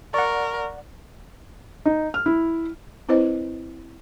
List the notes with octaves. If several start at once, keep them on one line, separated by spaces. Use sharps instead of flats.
A#4 D5 F#5 C#6
D#4
F6
E4
C4 E4 B4 C5 D#5